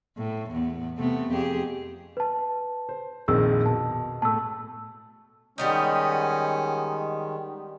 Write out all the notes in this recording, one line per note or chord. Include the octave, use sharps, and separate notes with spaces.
A2
E2 B3
C3 A3 B3
F2 G4 G#4
B4 A5
C5
A#1 F2 D#3 G#4 E6
B2 A5
A2 A3 A5 E6
D#3 G3 G#3 B3 C#4 D#4